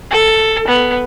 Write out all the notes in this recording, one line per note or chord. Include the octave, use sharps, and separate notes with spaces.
A4
B3